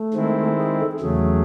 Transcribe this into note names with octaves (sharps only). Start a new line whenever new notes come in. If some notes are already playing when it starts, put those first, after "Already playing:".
Already playing: A3
D#3 G#3 C4 E4
G#4
A4
A4
E2 C#3 F#3 A3 G#4